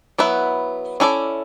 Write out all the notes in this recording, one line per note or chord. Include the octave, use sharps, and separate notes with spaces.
F#3 B3 E4 B4 E5
C#4 E4 A4 D5